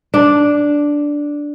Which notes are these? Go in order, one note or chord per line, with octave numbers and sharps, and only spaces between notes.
D4